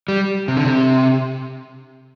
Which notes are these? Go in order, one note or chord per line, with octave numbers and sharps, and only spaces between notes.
G3
C3
D3
C3